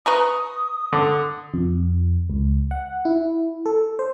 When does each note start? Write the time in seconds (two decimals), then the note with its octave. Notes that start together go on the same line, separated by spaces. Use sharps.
0.06 B4 A#5 C#6 D#6
0.93 D3
1.54 F2
2.30 C#2
2.71 F#5
3.05 E4
3.66 A4
3.99 C5